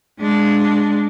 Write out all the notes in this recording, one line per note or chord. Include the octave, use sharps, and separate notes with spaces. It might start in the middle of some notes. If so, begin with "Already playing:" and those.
G#3 D4